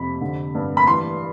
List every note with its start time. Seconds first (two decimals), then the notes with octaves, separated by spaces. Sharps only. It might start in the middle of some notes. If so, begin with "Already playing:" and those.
Already playing: F2 C3 B5
0.21 D3
0.55 G2
0.77 B5
0.87 E3 C6